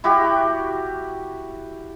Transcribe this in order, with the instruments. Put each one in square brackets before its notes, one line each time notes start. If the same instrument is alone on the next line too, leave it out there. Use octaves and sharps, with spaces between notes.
[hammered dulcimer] E4 F#4 G4